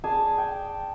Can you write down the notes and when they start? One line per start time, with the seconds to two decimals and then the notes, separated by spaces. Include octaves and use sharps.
0.04 G#4 D5 G#5 A5
0.38 G5